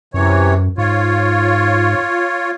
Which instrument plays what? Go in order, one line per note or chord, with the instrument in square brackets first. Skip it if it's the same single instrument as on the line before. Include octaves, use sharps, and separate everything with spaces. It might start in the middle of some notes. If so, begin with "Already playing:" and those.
[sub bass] F#2 [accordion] C3 E3 C#5
[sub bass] G#2 [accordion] F4 C#5